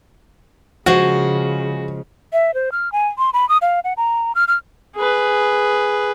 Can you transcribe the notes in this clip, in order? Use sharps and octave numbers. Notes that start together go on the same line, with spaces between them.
C#3 F3 G#3 F#4
E5
C5
F6
G#5
C6
B5
D#6
F5
F#5
A#5
F6
F6
G#4 B4